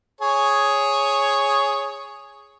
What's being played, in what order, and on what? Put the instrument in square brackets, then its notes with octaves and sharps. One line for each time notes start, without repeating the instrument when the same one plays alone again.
[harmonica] G#4 C#5